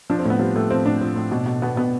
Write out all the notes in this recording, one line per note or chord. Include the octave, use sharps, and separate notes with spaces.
F3 D4
C4
A2
B3
F3 G3
A2 A3
F3 C4
A2 D4
F3
A2
B2
B2
B2 B3
B2 B3